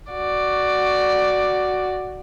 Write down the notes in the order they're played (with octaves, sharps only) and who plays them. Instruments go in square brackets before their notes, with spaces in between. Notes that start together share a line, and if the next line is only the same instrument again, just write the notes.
[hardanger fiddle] F#4 D5